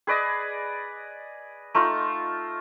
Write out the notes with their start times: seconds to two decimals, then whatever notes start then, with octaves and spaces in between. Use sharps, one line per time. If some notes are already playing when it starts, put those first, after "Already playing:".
0.07 G#4 B4 D5 D#5
1.75 A3 D#4 F4